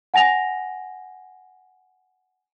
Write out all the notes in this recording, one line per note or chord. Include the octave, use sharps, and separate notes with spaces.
F#5 G#5 A#6 F7